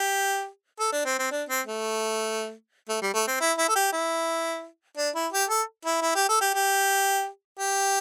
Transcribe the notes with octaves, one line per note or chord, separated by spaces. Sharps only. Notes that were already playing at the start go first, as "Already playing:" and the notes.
Already playing: G4
A4
D4
C4
C4
D4
C4
A3
A3
G3
A3
C4
E4
E4
A4
G4
E4
D4
E4
G4
A4
E4
E4
G4
A4
G4
G4
G4